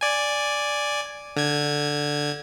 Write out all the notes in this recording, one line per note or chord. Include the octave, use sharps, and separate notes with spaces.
D5 G#5
D3 G#6